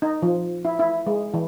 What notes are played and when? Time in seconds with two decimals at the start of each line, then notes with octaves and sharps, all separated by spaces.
0.02 D#4
0.22 F3
0.65 E4
0.79 E4
1.07 G#3
1.34 E3